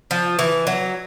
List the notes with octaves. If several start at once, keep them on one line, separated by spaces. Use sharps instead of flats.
F3
E3
F#3